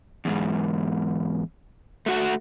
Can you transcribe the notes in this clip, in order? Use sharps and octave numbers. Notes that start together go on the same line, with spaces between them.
E2 G#2
A3 F#4 F#5